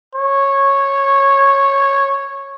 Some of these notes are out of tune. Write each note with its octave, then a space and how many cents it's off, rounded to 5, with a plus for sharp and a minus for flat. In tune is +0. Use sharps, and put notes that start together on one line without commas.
C#5 -10